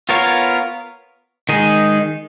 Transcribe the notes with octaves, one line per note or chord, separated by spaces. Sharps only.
B3 F4 A#4 C#5 F5
D#3 G#3 D#4 G#4